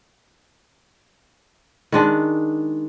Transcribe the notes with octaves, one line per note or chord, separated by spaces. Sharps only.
D#3 G#3 D4